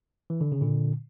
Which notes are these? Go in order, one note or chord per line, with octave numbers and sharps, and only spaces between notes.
E3
D3
C#3
A#2 D3